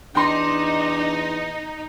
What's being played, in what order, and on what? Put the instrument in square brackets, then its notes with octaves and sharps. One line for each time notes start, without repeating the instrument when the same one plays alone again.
[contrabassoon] E2 [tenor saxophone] D4 [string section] D#4 [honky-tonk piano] G5 C6